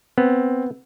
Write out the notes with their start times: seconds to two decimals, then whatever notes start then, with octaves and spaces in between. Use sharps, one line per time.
0.18 B3 C4